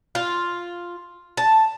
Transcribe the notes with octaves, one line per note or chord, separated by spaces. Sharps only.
F4
A5